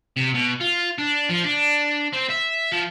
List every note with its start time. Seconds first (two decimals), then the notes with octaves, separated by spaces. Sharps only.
0.17 C3
0.34 B2
0.60 F4
0.98 D4
1.29 F3
1.44 D4
2.13 C4
2.30 E5
2.72 F3